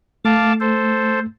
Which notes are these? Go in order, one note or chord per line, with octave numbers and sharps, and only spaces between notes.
A3 F5 A5 D6
A4 C5